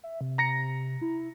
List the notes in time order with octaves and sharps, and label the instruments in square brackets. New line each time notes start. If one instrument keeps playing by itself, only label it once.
[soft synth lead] E5
C3
[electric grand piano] A#5 A#6 C#7
[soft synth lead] E4